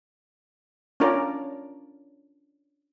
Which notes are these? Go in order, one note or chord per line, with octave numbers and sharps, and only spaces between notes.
C#4 D4 F4 A#4 D5